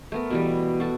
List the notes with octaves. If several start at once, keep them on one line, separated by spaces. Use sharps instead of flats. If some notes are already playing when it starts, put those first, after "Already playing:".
A3 B3 A#4
B2 E3 G3
F#4 A4